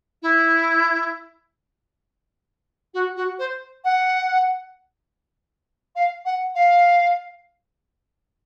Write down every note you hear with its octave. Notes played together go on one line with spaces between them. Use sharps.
E4
F#4
F#4
C5
F#5
F5
F#5
F5